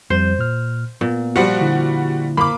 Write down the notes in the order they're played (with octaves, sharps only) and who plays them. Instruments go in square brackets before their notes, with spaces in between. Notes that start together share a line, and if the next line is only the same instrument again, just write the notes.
[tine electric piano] F2 G3 G6 [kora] C5
[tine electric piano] A#2 F6
[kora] A#2 [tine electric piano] B3
[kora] F3 F#5 [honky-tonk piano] G3 F#4
[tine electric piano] D3 E4
[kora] A#3 [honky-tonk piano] B5 D6